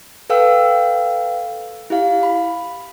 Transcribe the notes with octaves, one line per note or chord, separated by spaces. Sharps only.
A4 B4 F5 G5 E6
E4 G4 F5
B5